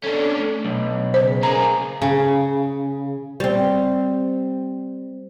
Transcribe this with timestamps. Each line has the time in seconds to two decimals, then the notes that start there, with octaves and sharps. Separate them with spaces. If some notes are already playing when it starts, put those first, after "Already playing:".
0.04 C#4 D4 A4
0.37 A3
0.65 B1
1.14 C#3 C5
1.43 A#3 G#4 A#5
2.02 C#3
3.40 G3 C4